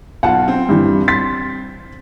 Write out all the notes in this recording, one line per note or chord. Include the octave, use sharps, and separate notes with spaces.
B1 F4 F5 F#5 A5
C4
G2 E3
C6 A6 B6